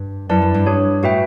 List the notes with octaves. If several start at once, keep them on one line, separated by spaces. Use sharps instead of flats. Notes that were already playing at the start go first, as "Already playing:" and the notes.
Already playing: G2
F#2 E4 B4 D5 A5
F#2
G2
D4 G4 C#5
A2 F#4 B4 E5 G5